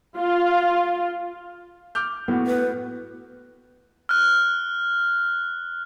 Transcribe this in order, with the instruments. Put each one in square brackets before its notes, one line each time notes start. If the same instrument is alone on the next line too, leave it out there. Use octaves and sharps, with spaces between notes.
[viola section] F4
[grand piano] D6 F6 G6
[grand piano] A2 F#4 [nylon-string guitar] B3
[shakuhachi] B4
[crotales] F6 F#6